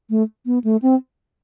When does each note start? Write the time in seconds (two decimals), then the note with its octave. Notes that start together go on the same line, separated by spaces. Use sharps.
0.10 A3
0.46 B3
0.64 A3
0.82 C4